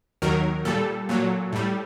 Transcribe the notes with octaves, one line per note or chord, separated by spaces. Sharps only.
D#2 D#3 F#3 A#4
A#2 G3 A4
A#2 F#3
A2 G3